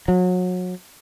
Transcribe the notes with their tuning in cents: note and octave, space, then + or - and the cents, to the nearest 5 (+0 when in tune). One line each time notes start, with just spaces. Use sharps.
F#3 -30